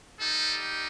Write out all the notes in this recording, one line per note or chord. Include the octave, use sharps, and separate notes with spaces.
G3 D#4 G4 A4